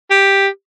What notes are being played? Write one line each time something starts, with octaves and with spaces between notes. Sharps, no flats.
G4